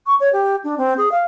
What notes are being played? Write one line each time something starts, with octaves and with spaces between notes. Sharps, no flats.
C#6
C#5
G4
D4
C4
G#4
F5